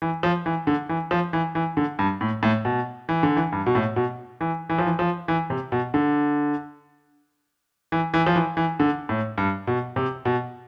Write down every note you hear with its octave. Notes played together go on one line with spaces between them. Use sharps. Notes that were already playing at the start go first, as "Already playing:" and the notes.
E3
F3
E3
D3
E3
F3
E3
E3
D3
G2
A2
A2
B2
E3
D3
E3
G2
B2
A2
B2
E3
E3
F3
E3
F3
E3
C3
B2
D3
E3
E3
F3
E3
E3
D3
A2
G2
B2
C3
B2